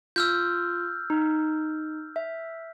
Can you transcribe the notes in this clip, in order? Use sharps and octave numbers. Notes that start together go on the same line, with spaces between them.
F4 E6 F6 G6
D#4
E5